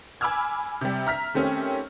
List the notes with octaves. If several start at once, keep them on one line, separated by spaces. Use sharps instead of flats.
G#5 B5 D6 E6 F6 G#6
C3 G3
E5 A#5 F6 B6
D#3 A3 C4 C#4 G4 C#5